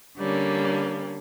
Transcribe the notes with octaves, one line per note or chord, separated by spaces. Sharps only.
D3 G3 A#3 C#4